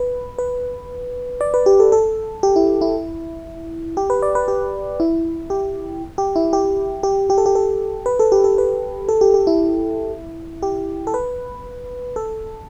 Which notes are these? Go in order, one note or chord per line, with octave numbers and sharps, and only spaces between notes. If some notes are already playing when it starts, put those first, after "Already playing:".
Already playing: B4
B4
D5
B4
G4
A4
A4
G4
E4
E4
G4
B4
D5
B4
G4
E4
G4
G4
E4
G4
G4
G4
A4
G4
A4
B4
A4
G4
A4
B4
A4
G4
G4
E4
G4
A4
B4
A4